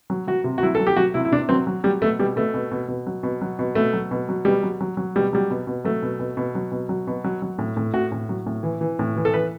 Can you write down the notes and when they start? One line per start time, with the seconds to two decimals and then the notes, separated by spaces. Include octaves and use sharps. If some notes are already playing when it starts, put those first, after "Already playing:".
0.10 F#3
0.27 F#3 F#4
0.44 C3
0.58 F#4
0.63 F#3 E4
0.75 F#3 A4
0.87 G4
0.96 F#3 F#4
1.14 C3 E4
1.25 E4
1.32 C3 D4
1.49 F#3 C4
1.67 F#3
1.84 F#3 G3
2.02 B2 A3
2.19 B2 G3
2.36 B2 A3
2.54 B2
2.71 B2
2.88 B2
3.07 F#3
3.23 B2
3.42 F#3
3.59 B2
3.75 B2 A3
3.93 F#3
4.11 B2
4.29 F#3
4.45 B2 G3
4.63 F#3
4.81 F#3
4.97 F#3
5.15 B2 G3
5.33 F#3 G3
5.50 B2
5.67 B2
5.85 F#3 A3
6.03 B2
6.19 B2
6.37 B2
6.55 F#3
6.72 B2
6.89 F#3
7.07 B2
7.24 F#3
7.42 F#3
7.58 A2
7.77 A2
7.93 A2 F#4
8.12 A2
8.29 F#3
8.46 A2
8.63 E3
8.81 E3
8.99 A2
9.16 E3
9.25 A4
9.34 E3 B4